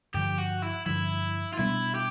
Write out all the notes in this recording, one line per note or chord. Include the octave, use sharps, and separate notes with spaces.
G2 D3 F3 G4
F#4
E4
G2 D3 F3 E4
F4
B2 G3 B3 D4 E4
G4